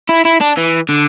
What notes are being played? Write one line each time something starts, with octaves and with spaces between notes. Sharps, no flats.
E4
E4
D4
E3
D3